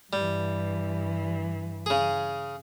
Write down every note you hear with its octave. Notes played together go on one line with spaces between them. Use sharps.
G2 E3 G3
C#3 G#4